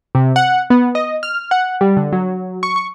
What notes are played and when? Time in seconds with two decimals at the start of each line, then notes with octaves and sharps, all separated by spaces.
0.15 C3
0.36 F#5
0.70 B3
0.95 D#5
1.23 F6
1.51 F#5
1.81 G3
1.97 D3
2.12 F#3
2.63 C#6
2.76 C#6